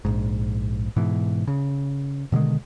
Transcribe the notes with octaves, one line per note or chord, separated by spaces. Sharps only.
A#1 G#2
G#2 B2 E3
C#3
B2 D3 D#3 G#3